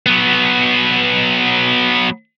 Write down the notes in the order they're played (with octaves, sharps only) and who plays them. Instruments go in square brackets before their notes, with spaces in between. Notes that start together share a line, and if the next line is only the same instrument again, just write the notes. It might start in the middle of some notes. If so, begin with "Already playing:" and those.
[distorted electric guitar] F#3 B3